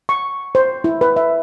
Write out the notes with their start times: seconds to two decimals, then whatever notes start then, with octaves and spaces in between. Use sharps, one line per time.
0.09 C#6
0.55 C5
0.84 E4
1.01 B4
1.16 E5